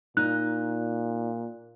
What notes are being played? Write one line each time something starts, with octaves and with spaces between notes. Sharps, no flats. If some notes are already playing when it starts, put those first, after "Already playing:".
A#2 D#4 F#6